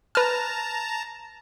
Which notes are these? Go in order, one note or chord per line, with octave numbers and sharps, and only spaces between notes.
B4 A5 A#5 F6